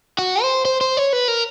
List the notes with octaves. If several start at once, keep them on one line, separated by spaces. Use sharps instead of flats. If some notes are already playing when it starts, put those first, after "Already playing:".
F#4
C5
C5
C5
C#5
B4
A#4